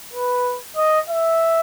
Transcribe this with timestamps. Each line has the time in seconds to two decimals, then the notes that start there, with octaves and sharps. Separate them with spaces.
0.13 B4
0.77 D#5
1.10 E5